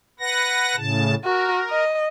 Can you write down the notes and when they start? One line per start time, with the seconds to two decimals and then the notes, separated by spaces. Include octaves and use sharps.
0.20 B4 F#5 A#6
0.76 A2 C#3 A5
1.24 F#4 A#4
1.70 D#5